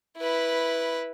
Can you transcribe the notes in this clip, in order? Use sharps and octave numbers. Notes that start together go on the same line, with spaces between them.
E4 B4